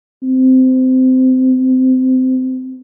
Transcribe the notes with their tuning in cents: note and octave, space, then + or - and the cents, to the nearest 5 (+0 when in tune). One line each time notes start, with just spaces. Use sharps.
C4 -20